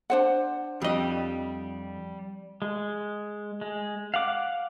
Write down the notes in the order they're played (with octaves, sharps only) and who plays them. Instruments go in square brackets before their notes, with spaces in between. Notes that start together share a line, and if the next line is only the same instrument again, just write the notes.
[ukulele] D4 C5 F#5
[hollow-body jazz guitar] F2 D#5 [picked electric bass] G3
[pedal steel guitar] G#3
G#3
F5 F#5 D6